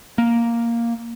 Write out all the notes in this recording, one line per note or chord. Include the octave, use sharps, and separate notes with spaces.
A#3